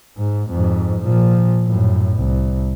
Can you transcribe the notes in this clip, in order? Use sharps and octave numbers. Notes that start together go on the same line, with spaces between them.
G#2
F2 G#2
A#2 F3
F#2 A2
C2